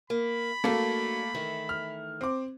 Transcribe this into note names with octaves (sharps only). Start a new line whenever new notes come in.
A#3 B5
F#3 A3 A#3 D4
D#3 E3 A3
F6
C4 D6